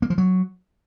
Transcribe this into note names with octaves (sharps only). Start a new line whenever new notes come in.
A#3
F3
F#3